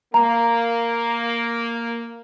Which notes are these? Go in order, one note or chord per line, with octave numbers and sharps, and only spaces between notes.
A#3 A#5